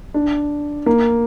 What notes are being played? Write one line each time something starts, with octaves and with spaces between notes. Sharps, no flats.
D4
A#3